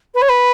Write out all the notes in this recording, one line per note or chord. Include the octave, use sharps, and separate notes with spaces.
B4
C#5
B4